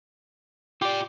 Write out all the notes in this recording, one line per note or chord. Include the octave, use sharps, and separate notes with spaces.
F4 G4 D5